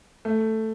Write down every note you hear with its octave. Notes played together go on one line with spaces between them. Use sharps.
A3